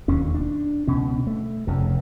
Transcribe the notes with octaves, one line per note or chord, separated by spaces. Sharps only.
E1 D#2 D3 C#4
D4
C#2 B2 C#4
A3
F1 F2 C#3